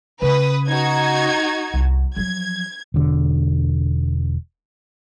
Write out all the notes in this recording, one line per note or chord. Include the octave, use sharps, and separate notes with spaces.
C#3 B4 D#6
D#4 F#4 G#6
C2
F3 F#3 G#6
E1 D3